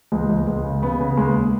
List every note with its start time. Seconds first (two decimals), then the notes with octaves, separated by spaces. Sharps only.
0.12 C#2 G#3
0.29 C#2
0.47 C#2 G#3
0.64 C#3
0.82 C#3 B3
1.00 C#3
1.17 D#2 G#3